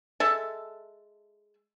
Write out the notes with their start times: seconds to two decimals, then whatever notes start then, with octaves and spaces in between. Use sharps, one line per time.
0.20 G#3 A4 E5 A5